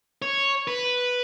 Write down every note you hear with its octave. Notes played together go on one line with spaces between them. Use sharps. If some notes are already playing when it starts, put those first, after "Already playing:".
C#5
B4